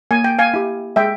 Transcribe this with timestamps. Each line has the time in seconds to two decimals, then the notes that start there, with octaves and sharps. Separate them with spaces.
0.11 A#3 G#5
0.24 G5
0.39 F5 G#5
0.54 E4 G4
0.96 G#3 E5 G5